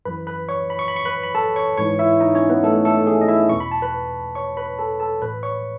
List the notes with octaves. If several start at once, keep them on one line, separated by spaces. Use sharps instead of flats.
F#2 E3 B4 B5
B4 B5
C#5 C#6
B5
C#6
B5
C#6
B4 B5
B5
A4 A5
C#5 C#6
G#2 E3 C#5 C#6
E4 E5
D#4 D#5
C#4 C#5
B3 B4
A3 A4
A3 A4
G#4
D#5
E4 E5
E2 B2 C#6
B5
A5
B4 B5
C#5 C#6
B4 B5
A4 A5
A4 A5
A2 E3 B4 B5
C#5 C#6